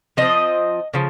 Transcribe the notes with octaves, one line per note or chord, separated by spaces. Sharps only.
F3 C4 D#5
C#3 F3